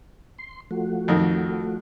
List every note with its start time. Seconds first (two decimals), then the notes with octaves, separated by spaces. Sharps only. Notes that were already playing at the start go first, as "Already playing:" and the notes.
0.38 C6
0.71 F3 A3 F#4
1.08 F2 D#3